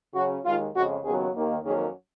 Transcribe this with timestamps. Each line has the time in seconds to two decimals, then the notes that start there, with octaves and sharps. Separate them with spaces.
0.14 C#3 F#3 C#4 F#4
0.44 D#2 D#3 G#3 F4
0.73 F2 C#3 G#3 F#4
1.03 D#2 C#3 F#3 B3 G#4
1.33 D#2 D#3 A#3
1.63 F2 D#3 F#3 A#3 C#4 G#4